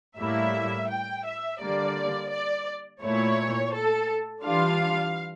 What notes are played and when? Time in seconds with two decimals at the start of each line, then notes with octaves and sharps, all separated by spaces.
0.18 A2 G3 A#3 E4 E5
0.89 G5
1.25 E5
1.61 D3 G3 A#3 D5
2.31 D5
3.02 A#2 A3 E4 C#5
3.73 A4
4.44 E3 G3 D4 F4 F5